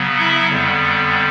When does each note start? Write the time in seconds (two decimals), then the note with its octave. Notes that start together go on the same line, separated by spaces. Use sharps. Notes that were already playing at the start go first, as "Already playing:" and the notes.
Already playing: C#3 F#3 B3
0.19 E4 E5
0.50 F2 D3 G3 B3